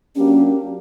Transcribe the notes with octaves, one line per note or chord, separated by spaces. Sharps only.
F#3 A#3 C#4 D4 G4